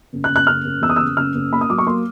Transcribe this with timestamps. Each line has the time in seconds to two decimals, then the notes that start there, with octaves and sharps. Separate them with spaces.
0.13 F#1
0.24 F#6
0.29 F#1
0.36 F#6
0.47 F#1 F6
0.65 F#1
0.82 E2 E6
0.89 D#6
0.96 E6
1.00 F#1
1.17 F#1 F6
1.35 F#1
1.52 A#3 B5
1.61 D#6
1.70 F#3 D6
1.78 C#6
1.87 A#3 C6